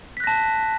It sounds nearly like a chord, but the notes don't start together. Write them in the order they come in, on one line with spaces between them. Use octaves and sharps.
B6 F#6 A#6 A5